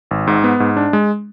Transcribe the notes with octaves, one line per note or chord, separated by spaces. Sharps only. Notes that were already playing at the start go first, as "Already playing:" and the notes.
G#1
G#2
B3
G#2
D4
G#3